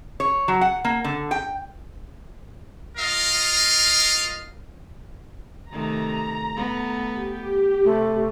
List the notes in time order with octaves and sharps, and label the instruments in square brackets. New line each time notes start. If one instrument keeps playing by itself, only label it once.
[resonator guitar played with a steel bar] C#5
F#3
F#5
A#3
D3
G5
[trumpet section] F4 A#4 D#5 F5
[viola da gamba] C3 D#3 A3 [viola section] A#5
[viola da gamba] A3 B3
[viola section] G4
[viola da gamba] C3 [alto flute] A3